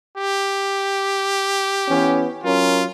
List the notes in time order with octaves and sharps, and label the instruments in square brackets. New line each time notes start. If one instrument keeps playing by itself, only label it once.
[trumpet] G4
[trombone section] E3 B3 C#4
[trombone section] F#3 C#4 A#4 [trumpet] F4